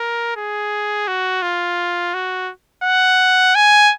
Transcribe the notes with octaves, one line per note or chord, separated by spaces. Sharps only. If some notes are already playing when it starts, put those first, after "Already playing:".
Already playing: A#4
G#4
F#4
F4
F#4
F#5
G#5